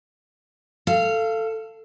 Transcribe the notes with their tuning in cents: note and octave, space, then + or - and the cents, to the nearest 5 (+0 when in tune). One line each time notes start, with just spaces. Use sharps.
A4 +10 F5 -20